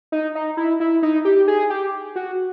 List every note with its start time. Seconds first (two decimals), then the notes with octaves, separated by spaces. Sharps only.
0.12 D#4
0.35 D#4
0.57 E4
0.80 E4
1.03 D#4
1.25 G4
1.48 G#4
1.70 G4
2.16 F#4